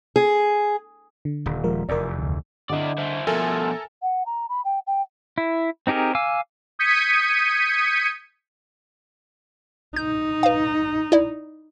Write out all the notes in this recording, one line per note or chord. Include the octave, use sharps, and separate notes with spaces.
G#4
D3
D#1
F3 G#3 A#4
F1 E2 A#4 D5
D2
D3 E4 D5 D#5 D6
E4 C5
B2 F3 A4 A#4 E5 G#5
F#5
A#5
B5
G5
G5
E4
C4 D#4 G4 G#4 A#4
F5 G#5 D6 E6
D#6 G6 G#6 B6 C#7 D#7
D#4 G6
B4 F5
E4 D5